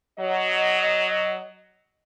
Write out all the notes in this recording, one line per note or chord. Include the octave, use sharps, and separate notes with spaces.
F#3 D#5